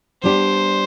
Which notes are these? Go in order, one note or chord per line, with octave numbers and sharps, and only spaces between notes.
G3 B3 D4 G4 C5